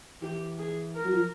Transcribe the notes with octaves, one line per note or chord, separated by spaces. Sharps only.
E3 G4
G#4
A#4
F#3
F3